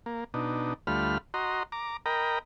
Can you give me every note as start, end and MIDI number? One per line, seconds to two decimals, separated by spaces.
0.06 0.24 58
0.34 0.74 47
0.34 0.74 62
0.34 0.74 63
0.87 1.18 38
0.87 1.18 55
0.87 1.18 57
0.87 1.18 65
0.87 1.18 83
0.87 1.18 89
1.34 1.63 66
1.34 1.63 75
1.34 1.63 82
1.34 1.63 84
1.72 1.97 82
1.72 1.97 86
2.06 2.39 70
2.06 2.39 75
2.06 2.39 79
2.06 2.39 82
2.06 2.39 83